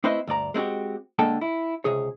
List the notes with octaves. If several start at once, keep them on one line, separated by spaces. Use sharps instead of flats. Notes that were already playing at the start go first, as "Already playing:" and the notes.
A3 C4 E4 B4 C5 D#5
D2 G2 D5 A#5
G#3 C4 C#4 F#4 G4
D3 G#3 A#3 A4 G5 A5
E4
C#2 C3 G#4 C#5